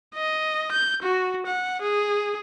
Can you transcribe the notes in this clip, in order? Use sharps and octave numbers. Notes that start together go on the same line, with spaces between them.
D#5
G6
F#4
F#5
G#4